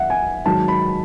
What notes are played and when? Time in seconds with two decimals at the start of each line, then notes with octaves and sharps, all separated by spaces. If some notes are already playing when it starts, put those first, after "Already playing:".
Already playing: D#2 D#3 F#3 E5 F#5
0.10 G#5
0.46 G#2 D#3 F#3 A5
0.68 B5